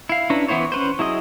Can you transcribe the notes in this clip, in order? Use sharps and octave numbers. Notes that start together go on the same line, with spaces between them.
E4 F5
C#4 D4 E4 B4 A#5
E3 B3 E4 C5 C#5
C#4 B4 C5
F#3 E4 G#4 D#5